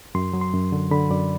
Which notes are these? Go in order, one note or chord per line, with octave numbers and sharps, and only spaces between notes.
F#2 C6
F#3
C6
F#2
D3
D3 B5
F#2 D5